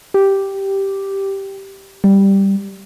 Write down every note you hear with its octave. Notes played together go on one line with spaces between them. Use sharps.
G4
G3